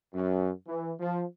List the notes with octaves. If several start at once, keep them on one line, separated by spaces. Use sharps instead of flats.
F#2
E3
F3